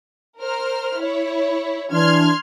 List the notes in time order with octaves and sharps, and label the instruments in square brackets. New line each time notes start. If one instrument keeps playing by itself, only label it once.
[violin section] A#4 C5 F6
E4 C#5
[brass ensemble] E3 D4 [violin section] C6 F6 G#6